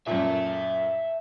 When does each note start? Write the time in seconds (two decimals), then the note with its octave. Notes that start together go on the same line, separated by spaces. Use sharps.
0.07 F#2 A#2 E5 A5